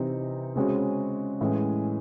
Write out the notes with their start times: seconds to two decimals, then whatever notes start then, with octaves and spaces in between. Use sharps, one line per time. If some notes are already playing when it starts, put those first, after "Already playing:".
Already playing: C3 E3 C4 D#4
0.56 C#3 G#3 C4 F#4 C#5
1.41 A2 E3 G#3 C#4